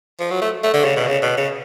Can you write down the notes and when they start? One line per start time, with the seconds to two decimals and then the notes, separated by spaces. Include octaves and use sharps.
0.19 F3
0.30 F#3
0.42 A3
0.63 A3
0.74 D3
0.85 C#3
0.96 B2
1.07 C#3
1.22 B2
1.37 C#3